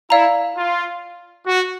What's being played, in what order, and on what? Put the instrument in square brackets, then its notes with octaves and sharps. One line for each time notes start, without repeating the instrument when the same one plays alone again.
[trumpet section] E4 [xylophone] D5 F5 A#5
[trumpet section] F4
F#4